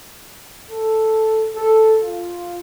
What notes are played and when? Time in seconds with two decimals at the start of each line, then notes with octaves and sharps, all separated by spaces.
0.71 A4
1.55 A4
2.02 F4